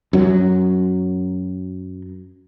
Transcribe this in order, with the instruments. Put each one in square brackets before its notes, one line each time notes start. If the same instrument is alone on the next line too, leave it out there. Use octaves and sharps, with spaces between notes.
[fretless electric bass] F#2 F#3